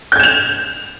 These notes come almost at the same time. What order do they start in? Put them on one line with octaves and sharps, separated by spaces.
G6 G#6 E7 F7